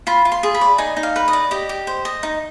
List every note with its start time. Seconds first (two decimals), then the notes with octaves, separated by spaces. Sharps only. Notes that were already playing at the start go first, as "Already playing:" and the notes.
0.07 F4 B5
0.25 F4
0.32 C6
0.43 G#4
0.55 B5
0.61 D5
0.78 D#4 G#5
0.97 D#4
1.03 F5
1.16 B4
1.28 D#5
1.33 D5
1.51 G4 D#5
1.69 G4
1.87 C5
2.05 D#5
2.23 D#4